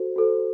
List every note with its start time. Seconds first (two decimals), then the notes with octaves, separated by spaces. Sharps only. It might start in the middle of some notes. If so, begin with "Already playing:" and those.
Already playing: F#4 A4 C5
0.16 F#4 A4 C5